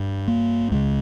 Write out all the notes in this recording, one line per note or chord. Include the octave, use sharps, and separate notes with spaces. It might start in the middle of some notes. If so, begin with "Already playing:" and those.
Already playing: G2
A#3
C#2 C#3 G#3